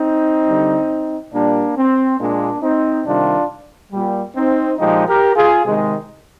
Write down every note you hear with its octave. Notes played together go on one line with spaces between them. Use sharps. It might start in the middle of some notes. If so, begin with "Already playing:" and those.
Already playing: C4 D#4
D3 G3
A#2 G3 A#3 D4
C4
A#2 G#3 A#3 D4
C4 D#4
C3 D#3 G3 D4 F4
A#2 G3
C4 D#4
A#2 F3 G#3 D#4 G4
G4 A#4
F4 G#4
C3 D#3 G#3